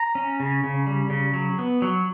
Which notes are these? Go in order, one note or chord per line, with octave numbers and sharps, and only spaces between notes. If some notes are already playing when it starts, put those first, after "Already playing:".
Already playing: A#5
C#4
C#3
C#3
G3
C#3
F#3
B3
F#3